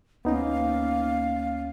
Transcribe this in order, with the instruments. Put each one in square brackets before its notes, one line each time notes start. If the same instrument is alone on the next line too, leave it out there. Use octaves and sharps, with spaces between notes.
[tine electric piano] D2 C#4 [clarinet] A#3 [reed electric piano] B3 D#4 [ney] F5